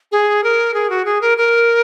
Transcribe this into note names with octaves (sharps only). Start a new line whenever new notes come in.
G#4
A#4
G#4
F#4
G#4
A#4
A#4